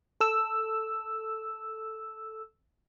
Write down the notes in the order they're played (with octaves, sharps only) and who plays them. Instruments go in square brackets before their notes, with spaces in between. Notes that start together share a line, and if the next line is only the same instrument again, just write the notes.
[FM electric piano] A4 E6